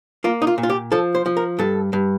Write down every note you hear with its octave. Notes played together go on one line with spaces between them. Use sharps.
A#3 F4
D#4
F4
A#2
F4
G4
F3 A4
C5
F3
A#4
G2 A4
G2